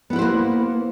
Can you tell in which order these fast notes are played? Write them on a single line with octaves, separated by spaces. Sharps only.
B3 E4 B4 C5 A#3